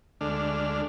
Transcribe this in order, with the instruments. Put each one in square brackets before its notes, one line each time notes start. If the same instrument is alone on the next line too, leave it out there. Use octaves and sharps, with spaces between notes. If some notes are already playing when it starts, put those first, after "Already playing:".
[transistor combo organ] D2 D3 G#3 A3 D4 F6